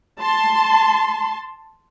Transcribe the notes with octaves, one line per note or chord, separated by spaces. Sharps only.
A5 C6